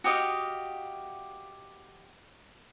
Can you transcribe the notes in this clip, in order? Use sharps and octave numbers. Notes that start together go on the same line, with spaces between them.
F#4 G4 D#5 F5